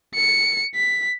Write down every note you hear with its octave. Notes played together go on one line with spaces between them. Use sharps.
C#7
B6